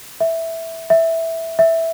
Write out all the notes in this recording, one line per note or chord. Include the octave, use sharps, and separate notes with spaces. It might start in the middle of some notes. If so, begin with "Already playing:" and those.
E5
E5
E5